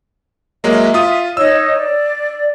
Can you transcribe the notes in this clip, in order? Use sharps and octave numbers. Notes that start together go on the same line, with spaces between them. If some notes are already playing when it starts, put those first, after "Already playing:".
F#3 G#3 A#3 E5
F4 D#6
D#4 C#5 D#5 E6
D5